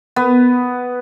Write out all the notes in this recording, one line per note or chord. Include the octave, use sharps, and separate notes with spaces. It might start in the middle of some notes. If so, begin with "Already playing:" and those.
B3